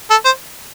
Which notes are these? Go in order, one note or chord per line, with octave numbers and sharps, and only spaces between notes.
A4
C5